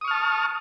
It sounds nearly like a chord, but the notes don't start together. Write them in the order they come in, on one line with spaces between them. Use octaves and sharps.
D#6 C#6 F6 A5